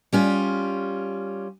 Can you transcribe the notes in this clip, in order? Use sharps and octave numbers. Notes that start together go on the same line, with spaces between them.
G3 C#4 F4